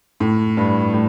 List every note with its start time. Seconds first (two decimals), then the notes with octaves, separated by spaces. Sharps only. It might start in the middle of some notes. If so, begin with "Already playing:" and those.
0.20 A2
0.57 G2
0.93 A2